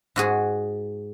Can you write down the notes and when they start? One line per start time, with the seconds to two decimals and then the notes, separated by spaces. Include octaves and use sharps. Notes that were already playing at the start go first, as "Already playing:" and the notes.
0.16 G#2 F#4 G#4